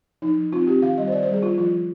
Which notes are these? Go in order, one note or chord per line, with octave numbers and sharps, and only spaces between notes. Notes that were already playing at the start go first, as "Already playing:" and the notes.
F3 D#4
F3
C4 F4
C4 G4
D#3 F5
G3 D#5
C5
D#3 D5
C5
G3 G#4
B3 F4
F3 F4
F3